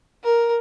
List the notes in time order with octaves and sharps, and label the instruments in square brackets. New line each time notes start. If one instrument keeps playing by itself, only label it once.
[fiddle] A#4